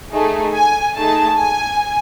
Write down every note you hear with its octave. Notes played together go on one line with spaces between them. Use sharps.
A3 D#4 G#4
G#5
A3 D#4 G#4 A5
G#5